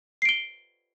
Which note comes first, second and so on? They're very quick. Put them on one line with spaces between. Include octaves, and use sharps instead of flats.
C7 D7 G7